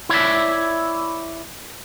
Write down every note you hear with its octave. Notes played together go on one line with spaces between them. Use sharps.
E4 C#5 D5 E5